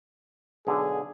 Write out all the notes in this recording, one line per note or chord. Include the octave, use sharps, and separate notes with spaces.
B1 D3 G#4